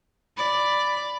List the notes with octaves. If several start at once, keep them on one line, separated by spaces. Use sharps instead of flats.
D5 B5